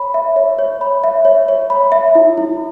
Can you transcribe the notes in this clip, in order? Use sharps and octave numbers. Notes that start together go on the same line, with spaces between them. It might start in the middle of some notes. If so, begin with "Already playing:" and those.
Already playing: C#5 B5
E5
C#5
C#5
B5
E5
C#5
C#5
B5
E5
E4
E4